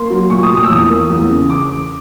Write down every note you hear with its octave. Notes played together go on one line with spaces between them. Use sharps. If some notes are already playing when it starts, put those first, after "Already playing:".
Already playing: A#3 C6
F#3
A#2 C#6
D#6
A#2
D#6
E6
E2 D#6
A#3
E2
C#3
D6